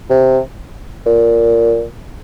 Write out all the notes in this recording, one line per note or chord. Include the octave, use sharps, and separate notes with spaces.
C3
A#2